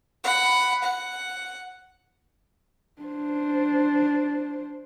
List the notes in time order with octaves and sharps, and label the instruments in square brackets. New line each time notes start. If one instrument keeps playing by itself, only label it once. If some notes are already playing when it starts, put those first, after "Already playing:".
[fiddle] F#5 B5
F#5
[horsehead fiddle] D4 C5